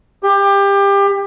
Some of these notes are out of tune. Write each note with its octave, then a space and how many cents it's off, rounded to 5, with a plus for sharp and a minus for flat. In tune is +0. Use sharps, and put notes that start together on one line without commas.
G4 +25